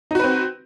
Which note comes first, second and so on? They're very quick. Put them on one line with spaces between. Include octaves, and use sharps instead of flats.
D#4 F#4 B4 C4